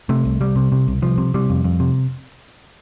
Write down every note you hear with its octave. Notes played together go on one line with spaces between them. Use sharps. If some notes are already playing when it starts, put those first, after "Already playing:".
C3 A3
C2
C2 G3
C3
C3
C2
C2 F3
C3
C3 G3
F2
F2
C3